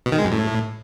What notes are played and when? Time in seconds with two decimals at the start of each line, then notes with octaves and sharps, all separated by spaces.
0.06 B2
0.12 D#3
0.19 G#3
0.25 F#2
0.31 A2